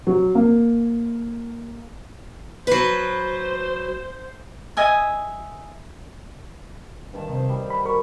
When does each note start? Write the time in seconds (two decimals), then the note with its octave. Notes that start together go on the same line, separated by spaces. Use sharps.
0.07 F#3
0.35 A#3
2.67 F#3 B4 C5
4.77 D#5 E5 G#5 D#6
7.13 G2 D#3 A5
7.29 C3 D#4 C5
7.49 G3
7.70 B5
7.85 F#3 A#4 B5 C#6